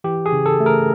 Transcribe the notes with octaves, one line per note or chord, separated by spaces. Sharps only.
E3 G4
G#4
C#3
A4
A3
A#4